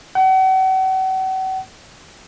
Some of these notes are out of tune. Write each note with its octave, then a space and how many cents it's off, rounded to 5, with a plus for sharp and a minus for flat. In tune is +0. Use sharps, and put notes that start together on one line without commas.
F#5 +40